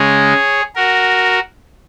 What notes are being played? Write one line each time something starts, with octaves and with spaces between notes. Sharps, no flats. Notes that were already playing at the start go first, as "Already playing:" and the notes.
Already playing: C#3 G#3 G#4 C#5
F#4 A#4